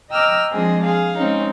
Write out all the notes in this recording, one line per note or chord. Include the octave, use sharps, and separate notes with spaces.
D#5 G5 A#5 D6 E6 F6
F3 G#3 C4 D4 G#4 D#5
G#4 F5
G#3 C4 C#4 D#4